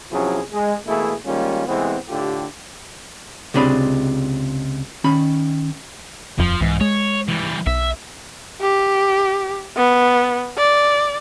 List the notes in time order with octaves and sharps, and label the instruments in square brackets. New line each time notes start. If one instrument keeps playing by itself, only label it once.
[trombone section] C3 F3 F#3 C#4 E4 G#4
G#3
B2 E3 A3 A#3 E4 G#4
D#3 G3 G#3 A#3 C#4 F4
C3 E3 G#3 A3 B3 C4
A2 D3 F4 G4
[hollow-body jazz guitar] C#2 C3 D4 G#4 B5
D#3 C#4 B5
[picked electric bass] D#1 F2 [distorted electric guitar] F3
[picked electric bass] C2 E3 [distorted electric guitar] G#2
[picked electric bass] G#3 [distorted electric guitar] C#5
[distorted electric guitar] E3 G3
[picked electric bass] B1 [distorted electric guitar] E5
[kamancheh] G4
B3
D5